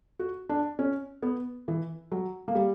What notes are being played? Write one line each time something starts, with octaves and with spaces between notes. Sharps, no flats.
F#4
D4
C#4
B3
E3
F#3
A#3
G3